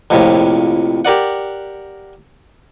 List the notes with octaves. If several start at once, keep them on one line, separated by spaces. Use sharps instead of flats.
A#1 F2 A2 C3
G4 A#4 D5 F#5